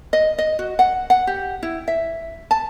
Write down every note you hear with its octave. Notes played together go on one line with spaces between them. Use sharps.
D#5
D#5
F#4
F#5
F#5
G4
E4
E5
A5